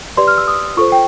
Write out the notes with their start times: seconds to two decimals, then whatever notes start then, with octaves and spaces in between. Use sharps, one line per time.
0.17 G4 B4 D5 C6
0.28 F6
0.38 E6
0.48 D#6
0.77 F4 A4 C5 C#6
0.92 G5